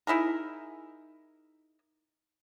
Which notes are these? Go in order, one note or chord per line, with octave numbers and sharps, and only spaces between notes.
D#4 E4 G#4 A#4